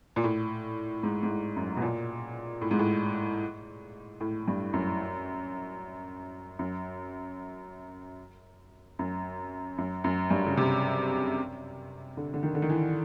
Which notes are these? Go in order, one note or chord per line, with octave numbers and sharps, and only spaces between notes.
A#2
A2
G#2
G#2
A2
F#2
B2
A#2
A2
G#2
A2
A2
G2
F#2
F#2
F#2
F#2
F#2
G2
C#3
C3
D3
D3
D#3
D3
D#3
E3